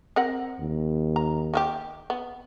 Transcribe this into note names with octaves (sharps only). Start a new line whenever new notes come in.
C4 A#4 F#5
D#2
A#5
D#3 F4 G4
B3